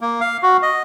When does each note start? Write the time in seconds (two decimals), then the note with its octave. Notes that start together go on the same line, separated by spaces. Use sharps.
0.01 A#3
0.21 F5
0.43 F#4
0.62 D#5